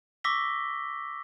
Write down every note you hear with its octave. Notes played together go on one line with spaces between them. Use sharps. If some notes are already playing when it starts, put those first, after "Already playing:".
C#6 D6 E6 A#6 B6 G7